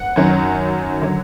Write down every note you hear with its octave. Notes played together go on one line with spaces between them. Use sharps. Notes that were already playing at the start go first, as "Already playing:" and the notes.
Already playing: F#5
F#2 D#3 F#3
D3 F#3